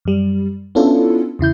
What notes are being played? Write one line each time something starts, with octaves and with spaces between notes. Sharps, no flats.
F#2 G3
B3 C#4 D4 E4 F4 A4
E2 C#3 E4 G6